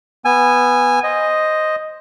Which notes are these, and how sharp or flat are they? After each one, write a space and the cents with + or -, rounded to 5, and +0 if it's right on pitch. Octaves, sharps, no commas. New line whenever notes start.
B3 +0 G#5 -10 E6 +30
C5 +0 D#5 +0